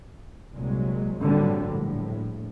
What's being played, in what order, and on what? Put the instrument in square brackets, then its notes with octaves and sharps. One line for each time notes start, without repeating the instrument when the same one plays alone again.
[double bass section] C2 A#2 F#3 G#3
G#1 G2 A#2 D3 F#3 G3
A#1 A2